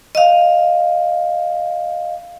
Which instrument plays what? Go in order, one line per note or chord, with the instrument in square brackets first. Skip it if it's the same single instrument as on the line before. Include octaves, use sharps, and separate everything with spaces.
[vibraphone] D#5 F5